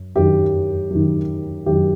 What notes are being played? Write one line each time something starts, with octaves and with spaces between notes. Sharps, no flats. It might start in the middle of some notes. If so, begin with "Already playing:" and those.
Already playing: F#2
F#2 D#3 G4
F#2 D#3
F#2 D#3 G4